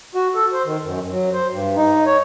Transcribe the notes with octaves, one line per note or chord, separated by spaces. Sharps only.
F#4
A4
C5
D#3
F#2
F#3
C5
G2
D#4
C#5